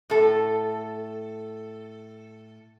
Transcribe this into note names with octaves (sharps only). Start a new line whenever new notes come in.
A2 A4